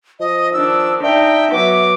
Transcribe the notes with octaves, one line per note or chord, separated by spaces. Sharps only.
F3 D#5
D#3 D4 E6
D4 D#4 E5 G5
F#3 B3 D6